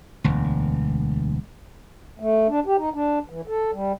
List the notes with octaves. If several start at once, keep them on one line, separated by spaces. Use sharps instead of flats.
E1 D2
A3
D4
G4
D#4
D4
E3
A4
G3